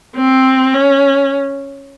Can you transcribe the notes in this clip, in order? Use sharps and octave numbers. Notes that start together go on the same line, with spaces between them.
C4
C#4